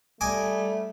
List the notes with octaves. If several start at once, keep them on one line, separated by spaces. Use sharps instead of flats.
G3 A3 D#5 G#5 D6